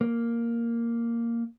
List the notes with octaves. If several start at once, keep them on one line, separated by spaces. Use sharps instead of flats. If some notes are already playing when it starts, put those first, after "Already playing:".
A#3